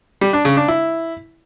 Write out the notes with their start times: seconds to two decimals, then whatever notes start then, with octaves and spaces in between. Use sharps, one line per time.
0.21 G3
0.33 D4
0.45 C#3
0.57 D4
0.68 E4